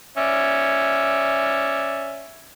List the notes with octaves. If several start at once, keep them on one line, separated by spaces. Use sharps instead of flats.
C#4 D5 E5